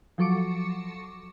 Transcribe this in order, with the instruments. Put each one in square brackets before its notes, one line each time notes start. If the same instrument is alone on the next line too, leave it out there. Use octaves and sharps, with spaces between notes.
[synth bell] F3 F#3 A4 C#6 D6 C#7